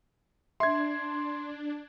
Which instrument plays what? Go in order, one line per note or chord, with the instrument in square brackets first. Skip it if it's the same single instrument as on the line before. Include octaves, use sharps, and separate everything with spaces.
[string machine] D4 [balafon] E5 [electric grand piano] C6 G#6